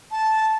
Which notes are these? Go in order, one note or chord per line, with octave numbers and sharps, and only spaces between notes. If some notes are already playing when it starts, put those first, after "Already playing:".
A5